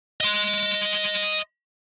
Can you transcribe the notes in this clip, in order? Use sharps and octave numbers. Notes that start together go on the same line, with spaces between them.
D#5 C6